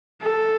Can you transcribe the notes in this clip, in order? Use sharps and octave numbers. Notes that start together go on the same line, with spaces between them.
A4